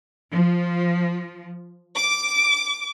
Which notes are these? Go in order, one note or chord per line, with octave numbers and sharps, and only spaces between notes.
F3
D6